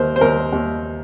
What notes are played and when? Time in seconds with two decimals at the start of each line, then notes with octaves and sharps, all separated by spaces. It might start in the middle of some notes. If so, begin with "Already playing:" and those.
Already playing: D#2 A#4 C5
0.16 C5
0.21 D#2 A#4
0.53 D#2